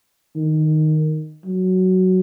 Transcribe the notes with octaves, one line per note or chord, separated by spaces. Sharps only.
D#3
F#3